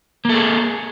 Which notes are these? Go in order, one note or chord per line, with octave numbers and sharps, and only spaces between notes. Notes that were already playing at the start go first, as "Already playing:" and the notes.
A#3 G#4 A4